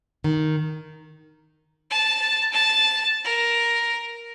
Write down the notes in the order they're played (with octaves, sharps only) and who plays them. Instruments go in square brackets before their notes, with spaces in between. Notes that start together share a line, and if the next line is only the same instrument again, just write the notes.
[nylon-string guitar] D#3
[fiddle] A5
A5
A#4